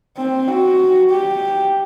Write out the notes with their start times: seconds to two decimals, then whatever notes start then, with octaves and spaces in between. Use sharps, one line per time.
0.17 C4
0.48 F#4
1.09 G4